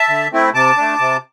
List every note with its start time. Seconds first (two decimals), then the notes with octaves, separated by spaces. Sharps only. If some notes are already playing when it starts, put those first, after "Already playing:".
Already playing: E5 A5
0.09 D3
0.32 A3 C4 E4
0.54 C3 A5 D6
0.77 A3 D4
0.99 C3